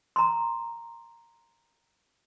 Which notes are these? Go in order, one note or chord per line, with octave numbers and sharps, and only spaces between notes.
A#5 C6